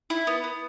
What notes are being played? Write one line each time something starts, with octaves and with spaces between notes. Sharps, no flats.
E4
B3
B3